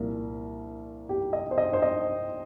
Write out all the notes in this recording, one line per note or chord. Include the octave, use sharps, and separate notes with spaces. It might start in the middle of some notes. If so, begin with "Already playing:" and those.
Already playing: C2 A#2 F3 A#4
G4
D#5
C5
D#5
C5
D#5